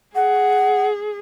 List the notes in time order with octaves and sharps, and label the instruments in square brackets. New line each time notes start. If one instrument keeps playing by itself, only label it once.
[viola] G#4 [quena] F#5